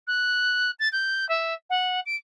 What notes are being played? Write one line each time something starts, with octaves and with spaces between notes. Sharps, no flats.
F#6
A6
G6
E5
F#5
D7